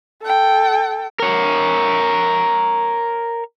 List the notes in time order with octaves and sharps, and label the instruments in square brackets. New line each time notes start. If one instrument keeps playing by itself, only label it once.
[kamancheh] A4 G5
[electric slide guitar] A#4 C#5